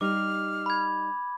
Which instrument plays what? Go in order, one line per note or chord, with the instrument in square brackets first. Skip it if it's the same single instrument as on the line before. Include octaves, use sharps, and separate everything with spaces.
[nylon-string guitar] G3 D#4 G4 [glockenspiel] D6 [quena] F6
[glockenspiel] B5 G#6